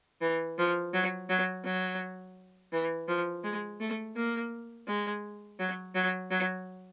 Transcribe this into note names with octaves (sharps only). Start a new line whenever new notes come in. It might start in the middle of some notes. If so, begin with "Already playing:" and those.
E3
F3
F#3
F#3
F#3
E3
F3
G#3
A3
A#3
G#3
F#3
F#3
F#3